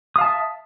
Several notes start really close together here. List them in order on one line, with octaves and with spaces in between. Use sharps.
D#6 F5 A5 E5